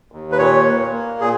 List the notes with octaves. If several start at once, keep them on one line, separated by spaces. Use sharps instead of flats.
D#2
B4
A#2 C#5
A#3
A#3
A#2 G#4